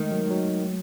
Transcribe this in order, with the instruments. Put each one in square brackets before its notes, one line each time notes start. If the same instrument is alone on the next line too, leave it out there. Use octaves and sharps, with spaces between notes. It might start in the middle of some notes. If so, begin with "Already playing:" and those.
Already playing: [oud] D#3 [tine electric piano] G#3 A3
[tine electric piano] F#3
F#3